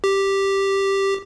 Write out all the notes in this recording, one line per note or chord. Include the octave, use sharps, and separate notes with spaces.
G4